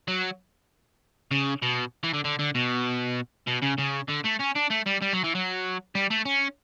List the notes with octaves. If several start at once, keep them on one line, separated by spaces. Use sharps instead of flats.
F#3
C#3
B2
E3
D3
D3
D3
B2
B2
C#3
C#3
D3
A3
C#4
D4
A3
G3
G3
F#3
E3
F#3
G3
A3
C#4